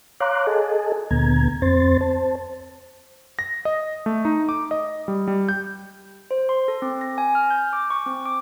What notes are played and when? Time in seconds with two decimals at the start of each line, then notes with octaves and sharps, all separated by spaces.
0.20 C#5 F5 A#5 C6 D6 F#6
0.47 G#4 A4 D#5 G#5 A5
1.11 D2 A#2 D3 B3 A#5 G#6
1.62 F2 C4 C5 C6 A6
2.01 C5 A5
3.39 A#6
3.65 D#5
4.06 A3
4.25 D#4
4.49 D6
4.71 D#5
5.08 G3
5.28 G3
5.49 G6
6.31 C5
6.49 C6
6.68 A4
6.82 C4
7.01 A#6
7.18 G#5
7.35 F6
7.50 G6
7.73 D6
7.90 C#6
8.06 C4
8.26 D6